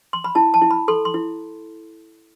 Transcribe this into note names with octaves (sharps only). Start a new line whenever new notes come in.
C6
B5
E4 A5
A5
E4
B5
A4 C6
C6
E4